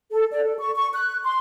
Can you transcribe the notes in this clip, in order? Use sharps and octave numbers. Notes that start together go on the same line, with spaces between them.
A4
D5
A4
C#6
C#6
F#6
C6